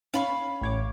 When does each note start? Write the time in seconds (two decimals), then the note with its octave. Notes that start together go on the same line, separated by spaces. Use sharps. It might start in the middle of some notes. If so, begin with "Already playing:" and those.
0.14 C#4 F5 B5 C#6
0.62 A1 C#5 D6